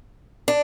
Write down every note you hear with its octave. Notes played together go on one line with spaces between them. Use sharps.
D4